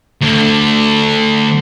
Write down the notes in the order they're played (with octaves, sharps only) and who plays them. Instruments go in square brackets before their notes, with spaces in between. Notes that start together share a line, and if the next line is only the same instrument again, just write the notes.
[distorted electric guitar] D2 D3